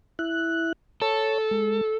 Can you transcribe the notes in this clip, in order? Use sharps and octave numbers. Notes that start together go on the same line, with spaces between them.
E4 F#6
A4 C#5
G#3